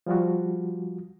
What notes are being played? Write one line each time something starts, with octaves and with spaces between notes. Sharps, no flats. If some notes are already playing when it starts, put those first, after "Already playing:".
F3 G3 F4 F#4